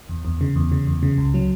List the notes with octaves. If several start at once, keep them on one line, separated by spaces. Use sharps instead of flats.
E2
E2
C#3
E2
C#3
E2
C#3
C#2
F#3